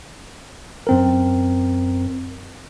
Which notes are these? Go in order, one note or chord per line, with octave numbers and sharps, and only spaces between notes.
F#2 C4 A#4